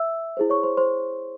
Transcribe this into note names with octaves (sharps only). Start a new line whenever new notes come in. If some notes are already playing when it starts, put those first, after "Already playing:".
Already playing: E5 E6
E4 G#4 C5
C#5 C#6
C5 C6
C5 C6